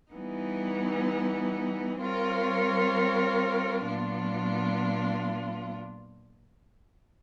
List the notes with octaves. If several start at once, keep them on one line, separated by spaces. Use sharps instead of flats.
E3 G3 B3 D#4
G3 C4 F4 A#4 C#5
A#2 F#3 B3 D4 F4